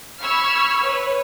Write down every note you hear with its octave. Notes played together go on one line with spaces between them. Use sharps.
B5 C#6 E6 F6 G#6
B4 C#5